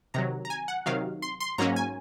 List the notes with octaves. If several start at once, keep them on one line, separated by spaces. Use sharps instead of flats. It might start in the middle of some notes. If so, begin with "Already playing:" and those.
C3 D#3 F#3 A#5
A#5
G#5
F#5
C3 D#3 F#3 F5
C6
C6
G#2 F#3 A#3 C#4 A#5
G#5